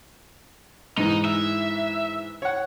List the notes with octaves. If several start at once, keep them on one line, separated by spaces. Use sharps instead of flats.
G#2 E3 D#4
E5
C#5 F#5